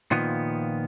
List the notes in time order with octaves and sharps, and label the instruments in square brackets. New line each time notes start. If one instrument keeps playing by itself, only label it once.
[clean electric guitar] A#2 D#3 F3 B3